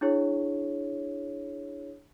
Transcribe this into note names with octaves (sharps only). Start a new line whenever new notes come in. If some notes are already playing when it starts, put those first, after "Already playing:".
D4 E4 G#4 C#5